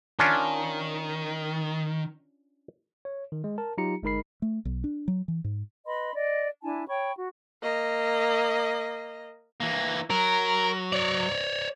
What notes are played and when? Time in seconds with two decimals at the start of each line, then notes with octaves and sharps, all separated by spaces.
0.19 D#3 C#4 D4 F4
3.05 C#5
3.32 D#3
3.44 G#3
3.58 A#4 A5
3.78 F#3 D#4 F4 G4 A#5 C#7
4.03 G1 G#3 D#4 A#4 B5 C7
4.42 A3
4.65 B1
4.84 D4
5.08 F#3
5.28 E3
5.44 G#2
5.87 B4 D#5 B5 C6
6.14 D5 D#5
6.63 D4 E4 G#5 A5
6.89 C#5 G5 B5 C#6
7.16 F#4
7.63 A#3 D#5
9.60 E3 A#3
10.10 F#3 A#4
10.93 C#5 D5